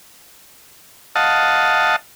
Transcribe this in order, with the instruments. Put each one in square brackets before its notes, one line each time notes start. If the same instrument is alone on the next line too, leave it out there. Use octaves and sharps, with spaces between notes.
[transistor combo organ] D#5 F5 F#5 A5